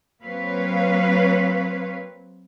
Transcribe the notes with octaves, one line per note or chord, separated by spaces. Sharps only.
F#3 A#3 C4 B4 C#5 F5